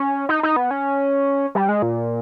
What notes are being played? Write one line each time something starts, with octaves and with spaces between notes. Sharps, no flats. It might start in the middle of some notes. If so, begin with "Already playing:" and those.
Already playing: C#4
D#4
D#4
B3
C#4
G3
G#3
A#2